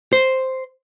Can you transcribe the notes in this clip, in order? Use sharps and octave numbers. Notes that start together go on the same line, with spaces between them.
C5